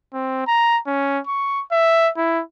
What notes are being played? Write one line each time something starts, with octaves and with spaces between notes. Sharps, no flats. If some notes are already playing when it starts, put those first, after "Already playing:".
C4
A#5
C#4
C#6
E5
E4